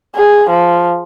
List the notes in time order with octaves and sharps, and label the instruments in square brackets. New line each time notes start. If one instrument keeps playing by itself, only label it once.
[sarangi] G#4
F3